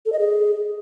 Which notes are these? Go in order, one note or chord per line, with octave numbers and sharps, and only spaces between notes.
A4
D#5
G#4